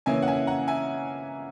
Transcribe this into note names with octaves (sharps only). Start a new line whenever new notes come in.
C#3 E3 A#3 C#4 E5 G#5
F#5
E5 G#5
F#5 A#5
E5 G#5